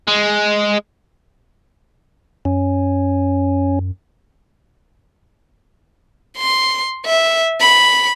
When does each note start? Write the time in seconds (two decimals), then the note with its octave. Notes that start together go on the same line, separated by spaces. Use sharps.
0.07 G#3
2.45 F#2 C#4
6.37 C6
7.06 E5
7.61 B5